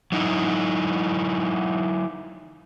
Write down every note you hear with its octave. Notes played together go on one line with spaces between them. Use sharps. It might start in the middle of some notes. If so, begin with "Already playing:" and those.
F#3 D#4 E4